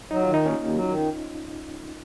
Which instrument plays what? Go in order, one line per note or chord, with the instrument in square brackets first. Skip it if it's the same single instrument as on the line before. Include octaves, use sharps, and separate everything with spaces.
[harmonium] F#3 [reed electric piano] D#4
[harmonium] D#3 [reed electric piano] F4
[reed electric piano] D#4
[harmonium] D#2 [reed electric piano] C#4
[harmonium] D#2
F#3
D#3